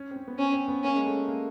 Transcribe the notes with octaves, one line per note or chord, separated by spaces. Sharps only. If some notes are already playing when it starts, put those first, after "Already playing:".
Already playing: C#4
C4
C#4
B3
C4 C#4
C4
B3
A#3 C#4
G#3
A3
A#3